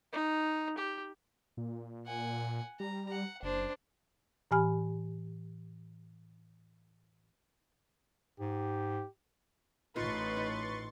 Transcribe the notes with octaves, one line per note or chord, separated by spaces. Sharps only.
D#4
G4
A#2
F#5 G#5
G3 A#5
F#5
F#1 D4 C5
A2 E3 G4 G#5 B5 F6
G#2 G4
A1 A2 D#4 F4 B4 C6 C#6 A6
D#4